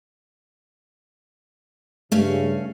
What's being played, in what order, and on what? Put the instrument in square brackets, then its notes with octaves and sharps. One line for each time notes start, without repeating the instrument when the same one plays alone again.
[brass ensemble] G2 C#3 [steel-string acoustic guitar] A3 C#4 F5